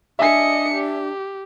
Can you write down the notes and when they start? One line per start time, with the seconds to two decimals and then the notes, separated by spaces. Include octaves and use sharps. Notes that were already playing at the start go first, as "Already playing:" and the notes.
0.19 D4 D#5 E5 G#5 C#7
0.74 G4